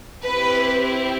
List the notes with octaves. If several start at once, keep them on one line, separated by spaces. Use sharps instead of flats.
C4 E4 G4 B4